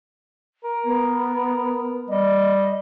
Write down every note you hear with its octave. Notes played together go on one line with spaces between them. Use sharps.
A#4
B3
G3 D#5